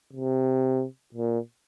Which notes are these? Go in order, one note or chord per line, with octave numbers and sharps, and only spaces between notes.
C3
A#2